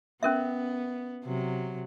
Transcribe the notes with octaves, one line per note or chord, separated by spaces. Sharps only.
B3 C#4 A#4 E5
C3 F#3